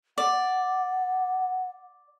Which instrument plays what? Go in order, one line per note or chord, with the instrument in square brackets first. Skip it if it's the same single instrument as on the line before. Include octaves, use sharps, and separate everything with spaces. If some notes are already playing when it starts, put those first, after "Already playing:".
[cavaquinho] D5 [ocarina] F#5